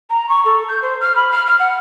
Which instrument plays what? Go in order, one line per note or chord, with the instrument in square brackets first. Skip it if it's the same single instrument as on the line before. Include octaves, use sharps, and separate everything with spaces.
[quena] A#5
C#6
A4
G6
C5
F6
B5
F6
F6
F#5